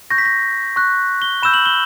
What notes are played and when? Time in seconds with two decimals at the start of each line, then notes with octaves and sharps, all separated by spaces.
0.10 C#6 G6 A#6
0.18 B6
0.25 A#6
0.76 C#6 F#6
1.22 G7
1.43 B5 E6 G6 E7
1.54 F#7
1.66 G7